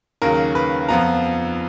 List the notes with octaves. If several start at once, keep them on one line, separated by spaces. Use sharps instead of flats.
D#2 C#3 F#3 A#4
B4
F2 F3 B3 F4 A#5